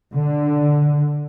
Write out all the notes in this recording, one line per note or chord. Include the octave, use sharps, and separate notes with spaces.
D3